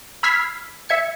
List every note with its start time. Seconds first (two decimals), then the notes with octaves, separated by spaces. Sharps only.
0.23 B5 E6 F6 G#6 B6 C7
0.89 E5 G#6 C#7